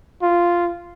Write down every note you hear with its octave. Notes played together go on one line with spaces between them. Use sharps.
F4